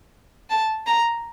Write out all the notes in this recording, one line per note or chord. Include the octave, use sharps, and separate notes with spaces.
A5
A#5